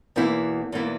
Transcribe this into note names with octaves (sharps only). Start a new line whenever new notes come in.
E2 B2 A#3 E4
E2 B2 A#3 E4